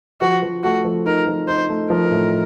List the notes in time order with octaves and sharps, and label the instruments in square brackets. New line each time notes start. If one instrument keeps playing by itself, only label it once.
[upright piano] F3 [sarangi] F#4
[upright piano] F3
[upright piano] A3 [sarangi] F#4
[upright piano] F3
[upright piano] D#4 [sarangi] A#4
[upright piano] F3
[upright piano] D#4 [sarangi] C5
[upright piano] A3
[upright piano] F3 [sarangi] A#4
[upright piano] A2